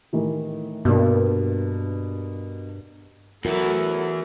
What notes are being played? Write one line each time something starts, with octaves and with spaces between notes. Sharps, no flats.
A2 D#3 E3
G2 B2 A#3 D4
E2 E3 F#3 A3 B3 E4 F#4 A#4